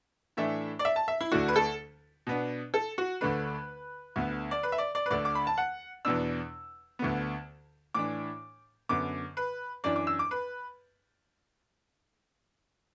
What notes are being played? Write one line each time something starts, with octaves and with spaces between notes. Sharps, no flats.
A2 E3 A3 D4 E5
D5
E5
A5
E5
E4
D2 D3 A3 D4 F#4
B4
A4
B2 B3 D4
A4
F#4
D2 D3 A3 D4 B4
D2 D3 B3
D5
B4
E5
D5
D5
B4
D2 D3 A3 D5
D6
B5
A5
F#5
E2 B2 B3 D4 E6
D2 D3 B3
A2 E3 D4 D6
F#2 D3 B3 D6
B4
F#2 E3 D4 D5
D6
E6
D6
B4